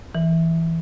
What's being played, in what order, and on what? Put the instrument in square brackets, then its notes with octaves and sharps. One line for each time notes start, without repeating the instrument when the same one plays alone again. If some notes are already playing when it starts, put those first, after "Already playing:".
[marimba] E3